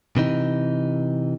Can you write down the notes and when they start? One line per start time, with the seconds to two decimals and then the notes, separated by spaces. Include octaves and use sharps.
0.17 C3 E3 D#4